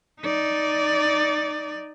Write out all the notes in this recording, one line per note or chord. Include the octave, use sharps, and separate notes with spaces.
D#4 D5